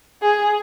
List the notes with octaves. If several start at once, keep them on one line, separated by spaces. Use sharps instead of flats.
G#4